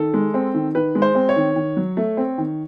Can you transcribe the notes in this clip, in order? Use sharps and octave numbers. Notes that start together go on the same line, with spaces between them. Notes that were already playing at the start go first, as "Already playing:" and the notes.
Already playing: D#3 A4
G#3
C4
D#3
D#3 B4
G#3
C5
C4
C#5
D#3
D#3
F#3
A3
C4
D#3